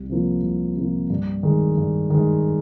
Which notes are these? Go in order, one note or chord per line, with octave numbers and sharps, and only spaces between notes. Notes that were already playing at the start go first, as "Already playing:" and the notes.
Already playing: C2
C3 F3 A#3
C2
C3 F3 A#3
G2
D#3 G#3
G2
D#3 G#3